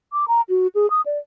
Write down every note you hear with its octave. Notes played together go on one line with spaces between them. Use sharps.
D6
A#5
F#4
G#4
D#6
D5